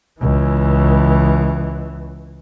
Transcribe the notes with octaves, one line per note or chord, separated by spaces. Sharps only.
C#2 E3